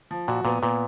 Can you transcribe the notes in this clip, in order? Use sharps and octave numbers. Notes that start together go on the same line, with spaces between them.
F3
A#2 F#4
A#2 B3
A#2 B3